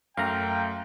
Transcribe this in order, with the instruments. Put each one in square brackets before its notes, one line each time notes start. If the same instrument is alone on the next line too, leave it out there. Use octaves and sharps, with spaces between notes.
[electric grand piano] F#2 A3 [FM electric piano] F5 A#5 [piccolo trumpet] G5